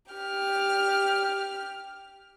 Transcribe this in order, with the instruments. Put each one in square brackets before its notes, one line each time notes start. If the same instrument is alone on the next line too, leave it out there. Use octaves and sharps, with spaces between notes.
[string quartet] G4 F6